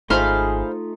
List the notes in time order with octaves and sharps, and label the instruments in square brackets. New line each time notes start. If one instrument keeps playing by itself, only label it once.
[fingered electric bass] G#1 [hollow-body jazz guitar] A3 D#4 F4 [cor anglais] G#4 [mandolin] C5 F5 B5